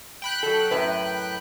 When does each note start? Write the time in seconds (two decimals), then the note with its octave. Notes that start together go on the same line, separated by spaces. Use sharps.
0.22 G5 B5 F#6
0.43 F#3 A4
0.71 F#2 A2 B4